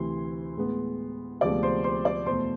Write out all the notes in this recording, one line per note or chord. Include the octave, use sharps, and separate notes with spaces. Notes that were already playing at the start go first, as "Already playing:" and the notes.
Already playing: D2 C3 E3 C6
A2 G#3 B3
D2 C3 F3 G#3 B3 D5 D6
C5 C6
C5 C6
D5 D6
E2 B2 A3 C5 C6